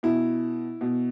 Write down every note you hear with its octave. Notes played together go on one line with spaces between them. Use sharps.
B2 E4
B2